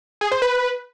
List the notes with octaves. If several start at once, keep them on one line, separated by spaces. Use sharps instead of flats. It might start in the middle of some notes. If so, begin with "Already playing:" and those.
G#4
C5
B4